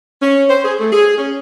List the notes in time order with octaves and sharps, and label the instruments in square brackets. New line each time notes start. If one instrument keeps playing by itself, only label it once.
[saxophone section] C#4
C5
G#4
A3
G#4
C#4